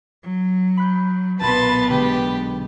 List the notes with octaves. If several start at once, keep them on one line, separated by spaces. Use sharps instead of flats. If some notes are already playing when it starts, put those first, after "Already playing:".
F#3
B5 F#6 G6
B1 A#2 B3 B4 A5 B5 C6
D3 G#3 G4